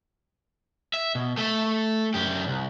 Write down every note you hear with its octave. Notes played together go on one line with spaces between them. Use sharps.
E5
B2
A3 E5
F#2 G4
C2